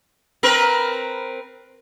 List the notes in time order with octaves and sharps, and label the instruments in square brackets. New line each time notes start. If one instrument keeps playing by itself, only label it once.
[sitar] C4 A#4 B4